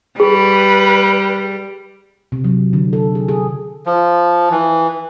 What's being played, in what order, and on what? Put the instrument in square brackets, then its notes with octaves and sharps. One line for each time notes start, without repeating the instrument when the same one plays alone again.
[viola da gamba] G3 [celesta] G#4 [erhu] B4
[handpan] C3
F#3
D3
A4
G#4
G#4
[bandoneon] F3
E3